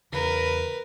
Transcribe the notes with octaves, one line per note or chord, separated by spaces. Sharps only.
E2 C#3 A#4 B4